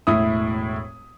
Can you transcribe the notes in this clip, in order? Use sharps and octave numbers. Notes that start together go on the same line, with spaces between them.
E1 A2 E4 D#6